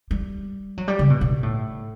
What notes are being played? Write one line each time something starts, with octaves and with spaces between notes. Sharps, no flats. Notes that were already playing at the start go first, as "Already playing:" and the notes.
G3
F#3
G3
C#3
B2
B2
A2